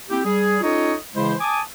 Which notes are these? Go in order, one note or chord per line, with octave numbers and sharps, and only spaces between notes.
A#3 C4 E4 G4
G3 G#4
C#4 D#4 F4 A4 C#5 D#5
C#3 E3 G#3 E4 C5
G#5 A5 D6 D#6